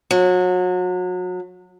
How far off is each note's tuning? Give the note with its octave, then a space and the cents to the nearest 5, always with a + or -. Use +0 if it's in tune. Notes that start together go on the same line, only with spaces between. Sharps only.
F#3 -30